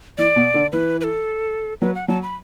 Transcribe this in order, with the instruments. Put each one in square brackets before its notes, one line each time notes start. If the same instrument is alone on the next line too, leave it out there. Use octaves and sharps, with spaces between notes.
[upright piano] E3 [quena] D5
[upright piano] B2
D3
[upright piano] E3 [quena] B4
[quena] B4
A4
[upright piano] F#3 [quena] B4
[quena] F#5
[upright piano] F#3 [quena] A5
[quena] B5